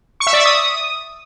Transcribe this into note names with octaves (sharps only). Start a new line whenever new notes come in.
C#6
E5
D5
E5
D#6